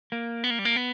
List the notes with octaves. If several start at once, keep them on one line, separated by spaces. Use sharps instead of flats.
A#3
B3
A#3
G3
A#3
B3